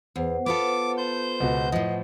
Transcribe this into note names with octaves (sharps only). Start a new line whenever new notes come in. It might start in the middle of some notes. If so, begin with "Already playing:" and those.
E2 B4 C5 F#5
B3 F4 A4 D6
C5 G6
C#2 B2 F#4 B4 F#5
A2 F3 D#5